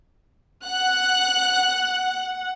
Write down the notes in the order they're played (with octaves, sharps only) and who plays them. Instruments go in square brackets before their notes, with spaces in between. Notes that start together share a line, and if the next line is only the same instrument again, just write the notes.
[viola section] F#5 [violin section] F#6